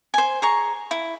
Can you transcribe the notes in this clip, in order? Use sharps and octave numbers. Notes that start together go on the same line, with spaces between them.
C5 G#5
G#4 A#5 C#6
E4